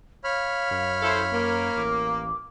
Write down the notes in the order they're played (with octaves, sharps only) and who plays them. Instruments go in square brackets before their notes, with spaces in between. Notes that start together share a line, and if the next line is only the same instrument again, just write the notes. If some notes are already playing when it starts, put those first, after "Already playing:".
[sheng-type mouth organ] C#5 B5 F6 [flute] F5
[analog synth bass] F#2
[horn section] E4 A4 C5
A#3
[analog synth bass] A1 [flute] D6